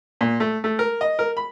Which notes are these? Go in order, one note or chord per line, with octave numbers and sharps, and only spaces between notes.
A#2
A3
A3
A#4
D#5
A#4
B5